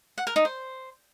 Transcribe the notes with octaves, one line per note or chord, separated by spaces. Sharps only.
F#5
A#4
D#4
C5